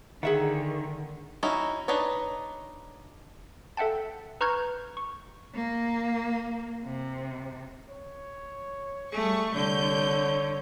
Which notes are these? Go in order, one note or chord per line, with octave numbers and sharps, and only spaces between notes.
D3 D#3 G#4 E5 F#5
C#4 D#4 E4 F#4
D4 D#4 B4 C#5
A4 E5 F#5 G5 A5
B4 A#5 C#6 F6 G6 G#6
C#6
A#3
C3
C#5
G3 A3 G#4 C#6
C2 D3 C#5 G6